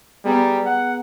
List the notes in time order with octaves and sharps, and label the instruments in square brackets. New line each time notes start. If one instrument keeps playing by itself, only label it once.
[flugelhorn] G3 [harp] B3 G#4 A#5
[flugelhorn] F#5